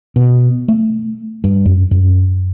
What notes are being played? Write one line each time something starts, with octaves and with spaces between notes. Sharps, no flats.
B2
A3
G2
F#2
F#2